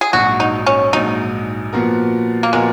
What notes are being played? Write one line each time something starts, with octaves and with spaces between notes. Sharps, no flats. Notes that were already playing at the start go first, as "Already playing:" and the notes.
G#4
A#1 G#2 F#3 F#4
D#4
C#4
A#1 G#2 F#3 D#4
A#2 F3 B3 F#4 A#4
A#3
A#2 F3 G#3 B3 F#4 A#4